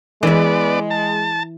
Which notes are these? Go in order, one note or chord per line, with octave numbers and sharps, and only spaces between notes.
E3 G#3 B3 D5 E5
A5